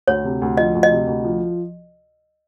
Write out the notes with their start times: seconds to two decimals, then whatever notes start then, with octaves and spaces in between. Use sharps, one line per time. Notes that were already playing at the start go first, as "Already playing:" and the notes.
0.07 D2 C#5
0.24 C3
0.42 D2
0.57 F3 D#5
0.75 D2
0.83 D#5
0.91 C3
1.07 D2
1.24 F3